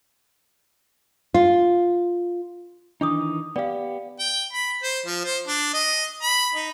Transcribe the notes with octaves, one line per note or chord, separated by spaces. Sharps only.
F4
D#3 E3 D4 D#4 D6 D#6
B3 G4 D5 F5
G5
B5
C5
F3
C5
D4
D#5
B5
D#4